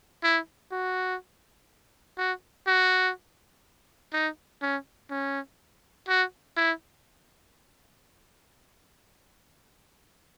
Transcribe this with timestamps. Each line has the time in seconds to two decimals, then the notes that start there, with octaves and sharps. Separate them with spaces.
0.23 E4
0.72 F#4
2.18 F#4
2.67 F#4
4.14 D#4
4.62 C#4
5.10 C#4
6.08 F#4
6.57 E4